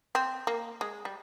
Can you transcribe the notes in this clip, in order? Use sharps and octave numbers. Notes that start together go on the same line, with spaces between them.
C4
A#3
G#3
G3